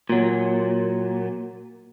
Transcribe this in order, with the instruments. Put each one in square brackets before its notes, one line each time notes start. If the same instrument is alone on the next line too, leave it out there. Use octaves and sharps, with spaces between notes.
[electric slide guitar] A#2 F#3